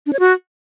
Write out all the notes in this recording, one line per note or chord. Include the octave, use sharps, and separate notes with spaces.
D4
C#5
F#4